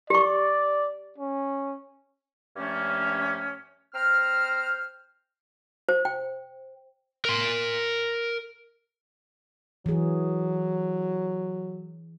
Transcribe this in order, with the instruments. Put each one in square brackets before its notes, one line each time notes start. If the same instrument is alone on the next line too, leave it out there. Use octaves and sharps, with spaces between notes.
[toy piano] G4 C#6 [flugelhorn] D5
[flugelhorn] C#4
[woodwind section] G2 F3 A3 A#3 C#4
C4 C5 A#5 F6
[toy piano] C5
G5
[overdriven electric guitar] A#4 C6
[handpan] E3 G#4 [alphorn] F#3